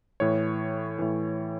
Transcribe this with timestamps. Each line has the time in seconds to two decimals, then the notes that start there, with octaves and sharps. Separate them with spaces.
0.20 A2 E3 C#5
0.99 A2 E3